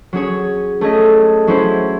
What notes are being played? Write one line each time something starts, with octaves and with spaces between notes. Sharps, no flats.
F#3 C#4 G#4 C#5
A3 C#4 G#4 D#5
F#3 C#4 E4 C5